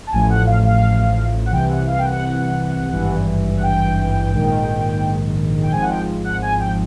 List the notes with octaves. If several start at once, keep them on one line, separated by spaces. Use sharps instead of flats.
A5
A1 A2 F3 G#5
F#5
F5
F5
F#5
C2 C3 E3 G5
F#5
F5
G5
F#5
G#1 G2 E3
F#5
G5
A#1 G#2 D#3
G5
G#1 G#2 F3 G#5
F#5
G5
F#5
G#5
G5